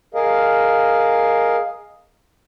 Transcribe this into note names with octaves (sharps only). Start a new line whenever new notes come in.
G#4 A#4 D#5 F5